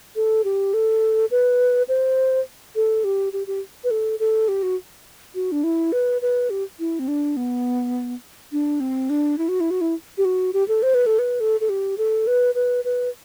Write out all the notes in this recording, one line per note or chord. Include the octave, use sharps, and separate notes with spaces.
A4
G4
A4
B4
C5
A4
G4
G4
G4
B4
A4
A4
G4
F#4
F#4
D4
E4
B4
B4
G4
E4
C4
D4
B3
D4
C4
D4
E4
F#4
E4
F#4
E4
G4
F#4
G4
A4
C5
B4
A4
B4
A4
A4
G4
A4
B4
B4
B4